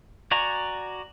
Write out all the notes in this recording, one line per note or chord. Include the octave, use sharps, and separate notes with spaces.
F#4 D5 G#5 A#5